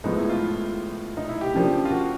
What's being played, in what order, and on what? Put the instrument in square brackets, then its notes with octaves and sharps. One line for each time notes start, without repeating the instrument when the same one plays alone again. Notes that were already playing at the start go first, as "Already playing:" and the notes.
[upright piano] A2 F3 G#3 B3 [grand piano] D#4
[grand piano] E4
F4
D#4
E4
G4
[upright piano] C#3 F3 A#3 D4
[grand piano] F4
F#4